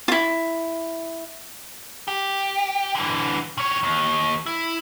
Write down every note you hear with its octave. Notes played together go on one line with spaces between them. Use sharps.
E4 F4
G4
D3 E3
D#3 C#5
D#2
E4